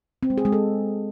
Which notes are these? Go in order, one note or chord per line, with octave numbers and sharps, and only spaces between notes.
C4
G#3
G#4
G#3
A4